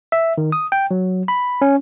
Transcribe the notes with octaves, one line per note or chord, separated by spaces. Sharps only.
E5
D#3
D#6
G5
F#3
B5
C#4